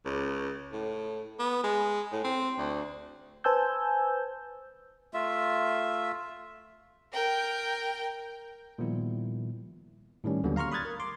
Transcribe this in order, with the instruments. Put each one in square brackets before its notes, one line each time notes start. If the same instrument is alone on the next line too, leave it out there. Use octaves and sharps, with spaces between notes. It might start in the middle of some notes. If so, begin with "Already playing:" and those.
[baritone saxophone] C#2
A2
B3
G#3
A2
C4
D2
[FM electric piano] B4 C5 G#5 A5 E6 G6
[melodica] A3 F4 E5
[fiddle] A#4 G5
[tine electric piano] A#2 D#3 F3 G3 B3 E4
A2 D#3 G3 C#4
D#2 D3 F#3 G3 A#3 B3
F5 A#5 C6 C#6 F6
B5 D#6 F#6 G#6 A6
A#4
C6 D6